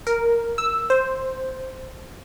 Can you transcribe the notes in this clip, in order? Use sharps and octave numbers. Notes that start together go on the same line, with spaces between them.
A#4
E6
C5